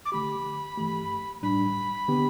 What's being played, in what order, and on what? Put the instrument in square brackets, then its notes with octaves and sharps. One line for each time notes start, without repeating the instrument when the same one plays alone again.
[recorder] D6
[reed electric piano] D3 A3 G4 [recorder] B5
[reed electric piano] G2 E3 A3 G4
[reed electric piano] A2 G3 D4 [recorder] B5
[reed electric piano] D3 B3 G4